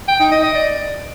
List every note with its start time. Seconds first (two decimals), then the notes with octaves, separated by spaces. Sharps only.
0.08 G5
0.20 D#4
0.31 D#5
0.43 D#5
0.55 D5